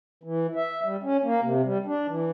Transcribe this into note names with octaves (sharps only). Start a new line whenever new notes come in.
E3
E5
G3
C#4
A#3
C3
G3
D4
E3